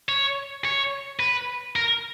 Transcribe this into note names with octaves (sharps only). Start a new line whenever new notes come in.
C#5
C#5
B4
A#4